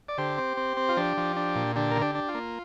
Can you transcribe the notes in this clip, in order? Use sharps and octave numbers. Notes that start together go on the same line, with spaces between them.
D5
D3 G4 C5
C4
C4
C4
F4
F3 D4 G4
F3
D4
A#2
D3 D4 G4
D3 A#4
D4 G4
D4
F4
A#3